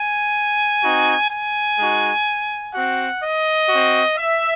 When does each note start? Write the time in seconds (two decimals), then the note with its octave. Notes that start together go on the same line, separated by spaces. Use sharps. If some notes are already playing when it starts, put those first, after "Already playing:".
Already playing: G#5
0.83 C4 D#4 F#4
1.30 G#5
1.78 G#3 D#4 F#4
2.73 C4 F#4 F#5
3.21 D#5
3.69 C4 F#4
4.17 E5